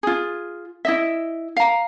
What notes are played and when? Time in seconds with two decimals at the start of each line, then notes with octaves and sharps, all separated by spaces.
0.03 F4 G#4
0.85 E4 D#5 E5
1.57 F5 A#5